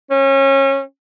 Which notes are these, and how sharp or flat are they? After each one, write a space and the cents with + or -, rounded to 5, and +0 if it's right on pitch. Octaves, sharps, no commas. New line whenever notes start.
C#4 -25